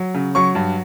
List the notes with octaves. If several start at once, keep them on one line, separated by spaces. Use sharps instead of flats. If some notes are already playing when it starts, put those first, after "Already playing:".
Already playing: F#3
C#3
F#3 C#6
G2